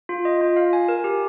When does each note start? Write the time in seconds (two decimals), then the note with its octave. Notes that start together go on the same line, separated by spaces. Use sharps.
0.09 F4
0.25 D#5
0.41 F4
0.56 F5
0.73 G#5
0.89 A#4
1.04 G4